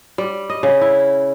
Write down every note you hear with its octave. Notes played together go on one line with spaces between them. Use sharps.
G3
D#5
C#3
E4